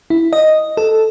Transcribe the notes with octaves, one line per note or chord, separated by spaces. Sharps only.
E4
D#5
A4